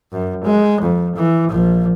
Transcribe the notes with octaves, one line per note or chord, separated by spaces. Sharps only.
F#2
G#3
F2
E3
A#1 F3